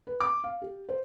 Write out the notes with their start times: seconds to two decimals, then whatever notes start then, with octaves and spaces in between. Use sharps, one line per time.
0.07 B4
0.20 D6
0.44 F5
0.62 G4
0.89 C5